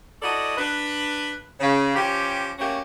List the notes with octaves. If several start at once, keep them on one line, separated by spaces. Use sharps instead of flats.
E4 F#4 A4 D5 D#5
D4 B4
C#3
F3 C#4 G4
A3 A#3 C#4 F#4 G4